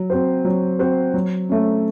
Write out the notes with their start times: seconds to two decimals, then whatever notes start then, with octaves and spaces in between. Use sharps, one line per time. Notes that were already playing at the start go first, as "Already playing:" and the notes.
Already playing: F#3
0.10 C4 F#4 C5
0.45 F#3
0.79 C4 F#4 C5
1.14 F#3
1.49 A3 C#4